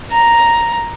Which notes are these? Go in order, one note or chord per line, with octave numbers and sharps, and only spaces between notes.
A#5